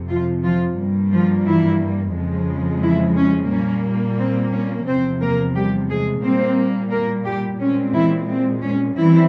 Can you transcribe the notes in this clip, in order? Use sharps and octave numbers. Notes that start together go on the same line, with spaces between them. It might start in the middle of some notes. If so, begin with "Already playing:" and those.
Already playing: F2 C3
F3 F4
F3 F4
G2 G3 A#3
F3 F4
E3 E4
F2 C#3 F3 G#3
E3 E4
C#4
A#2 G3 A#3 C#4
C4
C#4
E2 C3 F3 C4 C5
A#3 A#4
G3 G4
G#3 G#4
A#2 G3 A#3 C4 C5
A#3 A#4
G3 G4
A#2 G#3 C4 C#4
E3 E4
C4
C#4
E3 G3 C4 E4